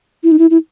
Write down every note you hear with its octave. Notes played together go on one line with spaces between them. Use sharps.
E4
D#4
E4
E4